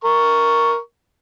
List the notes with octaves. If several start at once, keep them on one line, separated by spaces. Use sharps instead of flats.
A#4 C#6